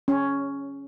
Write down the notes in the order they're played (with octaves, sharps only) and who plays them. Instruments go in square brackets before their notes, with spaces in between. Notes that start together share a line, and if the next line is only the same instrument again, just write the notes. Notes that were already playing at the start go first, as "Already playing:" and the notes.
[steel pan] C#4